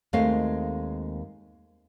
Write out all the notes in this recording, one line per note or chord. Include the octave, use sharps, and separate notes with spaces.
D#2 G#3 A3 C4 D#5 F5